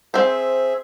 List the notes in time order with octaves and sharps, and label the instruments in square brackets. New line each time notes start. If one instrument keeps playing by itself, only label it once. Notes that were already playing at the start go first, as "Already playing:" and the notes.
[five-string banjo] C4 C5 [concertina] G#4 E5